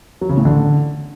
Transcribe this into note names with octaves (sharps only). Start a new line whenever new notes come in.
F#3
C#3
A2
D3